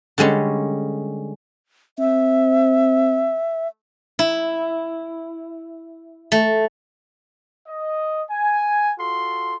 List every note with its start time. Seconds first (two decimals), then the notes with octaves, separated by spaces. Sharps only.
0.18 D3 G3 G#3 C#4
1.99 C4 E5
4.19 E4
6.32 A3
7.67 D#5
8.30 G#5
8.99 F4 F#4 A4 C6